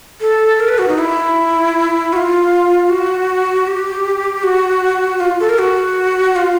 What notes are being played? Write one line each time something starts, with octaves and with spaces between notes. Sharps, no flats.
A4
A#4
B4
F#4
D#4
E4
F#4
F4
F#4
G4
F#4
F4
A4
A#4
F#4
F4